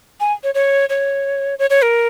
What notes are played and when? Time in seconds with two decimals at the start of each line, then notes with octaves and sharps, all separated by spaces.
0.20 G#5
0.44 C#5
0.55 C#5
0.89 C#5
1.59 C#5
1.70 C#5
1.82 A#4